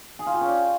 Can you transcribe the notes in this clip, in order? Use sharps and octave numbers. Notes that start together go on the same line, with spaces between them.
G#4
F4
G4
C#4
D5